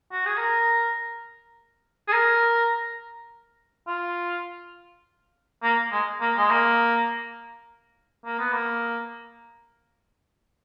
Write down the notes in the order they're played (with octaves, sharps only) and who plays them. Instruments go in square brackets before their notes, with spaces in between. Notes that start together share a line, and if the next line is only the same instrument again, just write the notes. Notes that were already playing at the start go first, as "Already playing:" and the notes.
[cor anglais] F#4
G#4
A#4
G#4
A#4
F4
A#3
G#3
A#3
G#3
A#3
A#3
B3
A#3